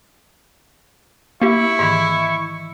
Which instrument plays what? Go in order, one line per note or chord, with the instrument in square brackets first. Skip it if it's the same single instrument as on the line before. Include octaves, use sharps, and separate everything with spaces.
[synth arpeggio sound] A#3 G4 [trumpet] E4 [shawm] C#6
[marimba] G#2 D#3 E3